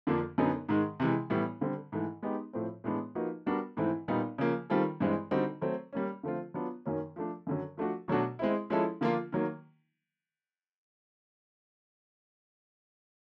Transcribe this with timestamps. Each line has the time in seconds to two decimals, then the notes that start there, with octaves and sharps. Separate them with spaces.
0.07 F2 D3 F3 A#3 D4
0.38 F#2 D3 F#3 B3 D#4
0.69 G#2 D#3 G#3
1.00 C3 E3 G#3
1.30 A2 E3 G3 B3 E4
1.61 D3 G3 C4
1.92 G#2 E3 A3
2.22 G#3 B3 D#4 G4
2.53 A2 F3 A3 C4
2.84 A2 E3 G#3 B3 D4
3.15 F3 A#3 D#4 F#4 B4
3.46 G3 B3 D4 F#4 A#4
3.77 G#2 E3 A3 C4 E4
4.08 A#2 G3 B3 D#4
4.38 C#3 F3 A#3
4.70 D#3 G3 C4 F4 A4
5.00 G2 E3 G#3 C4
5.31 D3 G3 C4 D#4 F#4
5.61 F#3 A3 C4
5.93 G3 A#3 C#4
6.23 D3 F3 A3 C4 F4
6.54 F#3 B3 D4 F4
6.86 F#2 D#3 F#3 A#3 C#4
7.16 F3 A3 D4
7.47 F#2 D3 F#3
7.77 F3 A3 D4 F#4
8.08 B2 F#3 A3 D4 F#4
8.39 G#3 C4 E4
8.70 F3 G#3 C#4 E4 A4
9.01 D3 F3 A#3 D4 F4
9.32 D#3 F#3 A#3